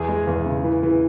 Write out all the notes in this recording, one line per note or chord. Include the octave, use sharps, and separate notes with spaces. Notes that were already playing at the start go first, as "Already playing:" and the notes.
Already playing: E2 G#4
G#3
E2
C#3
E3
E3